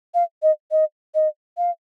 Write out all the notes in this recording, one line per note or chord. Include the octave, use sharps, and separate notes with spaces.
F5
D#5
D#5
D#5
F5